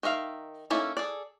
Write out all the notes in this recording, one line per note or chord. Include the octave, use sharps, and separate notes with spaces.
D#3 A#4 E5 F5
A#3 C#4 D#4 E4 A4
G#4 A4 D5